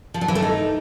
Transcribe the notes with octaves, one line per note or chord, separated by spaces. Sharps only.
F3
F#3
E3
A3
D#4